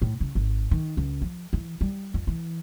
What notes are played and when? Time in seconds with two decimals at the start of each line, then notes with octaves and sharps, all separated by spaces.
0.02 A2
0.21 C#3
0.35 G#1
0.71 D#3
0.97 C#2
1.22 F3
1.53 E3
1.81 G3
2.14 F2
2.27 E3